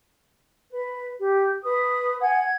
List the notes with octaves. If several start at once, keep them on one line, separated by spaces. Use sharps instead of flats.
B4
G4
B4 D#6
F#5 G#5 G#6
G#6